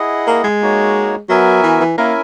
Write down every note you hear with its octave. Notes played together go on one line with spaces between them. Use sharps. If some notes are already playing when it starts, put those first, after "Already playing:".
Already playing: E4 G#4 D#5 F#5
A#3
G#3
A#3 D#4 F#4 C#5
F#3 B3 F#4 A#4 E5 G#5
E3
E3
A#3 C#4 E4 A#4 E5 G#5